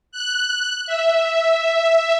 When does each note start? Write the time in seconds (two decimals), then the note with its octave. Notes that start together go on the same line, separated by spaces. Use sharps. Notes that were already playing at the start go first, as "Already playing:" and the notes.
0.12 F#6
0.86 E5